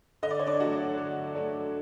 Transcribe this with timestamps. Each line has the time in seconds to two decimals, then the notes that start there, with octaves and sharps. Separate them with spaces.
0.23 D3 D#5
0.31 D5
0.39 C#5
0.47 D4 D5
0.60 F#3 A3 D4 F#4 F#5
0.97 D3
1.35 F#3 A3 D4